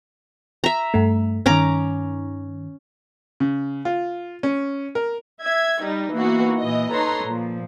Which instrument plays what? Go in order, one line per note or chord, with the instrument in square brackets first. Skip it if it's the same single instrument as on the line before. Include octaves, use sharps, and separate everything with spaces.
[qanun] E5 A#5
[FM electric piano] G2 A3
[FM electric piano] G2 D#3 [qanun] C#4 A#5 D6
[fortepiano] C#3
F4
C#4
A#4
[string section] E5 G#6
G3 D#4
E3 A#3 B3 D#4 F#4
A#2 E3 D#5
D#4 A4 B4 C#5 A#5 C6
A#2 F3